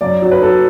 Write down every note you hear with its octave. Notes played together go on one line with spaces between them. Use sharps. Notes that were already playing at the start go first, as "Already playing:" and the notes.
F#2 D5
F#3
B4
F#3 A4